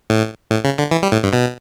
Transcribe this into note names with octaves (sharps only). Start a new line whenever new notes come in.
A2
A2
C#3
D3
E3
G3
A2
G2
B2